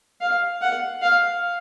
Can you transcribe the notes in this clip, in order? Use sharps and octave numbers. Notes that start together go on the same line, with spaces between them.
F5
F#5
F5